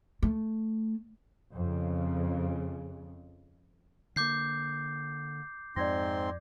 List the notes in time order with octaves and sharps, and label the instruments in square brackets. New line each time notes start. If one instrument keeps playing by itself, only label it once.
[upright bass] A3
[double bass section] F2 C#3
[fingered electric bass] D3 A#3 [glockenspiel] D6 G6 C7
[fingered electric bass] F2 [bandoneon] G#2 C4 C6 [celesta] D5 G#6 A#6